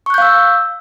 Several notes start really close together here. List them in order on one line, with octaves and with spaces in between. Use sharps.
C#6 F#6 G6 F5 E6